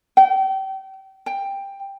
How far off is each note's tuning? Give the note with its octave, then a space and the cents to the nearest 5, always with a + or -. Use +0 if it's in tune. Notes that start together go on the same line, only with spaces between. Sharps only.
G5 -30
G5 +10